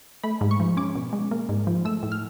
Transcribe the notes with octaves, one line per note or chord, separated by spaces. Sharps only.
A3 B5
G#2
C#6
F3
C#4 D6
B2
G#3
A#3
G#2
F3
A3 E6
A2
F6